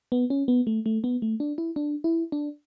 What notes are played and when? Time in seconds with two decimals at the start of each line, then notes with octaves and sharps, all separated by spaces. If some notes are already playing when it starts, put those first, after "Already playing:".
0.12 B3
0.30 C#4
0.48 B3
0.67 A3
0.86 A3
1.04 B3
1.22 A3
1.40 D4
1.58 E4
1.76 D4
2.04 E4
2.32 D4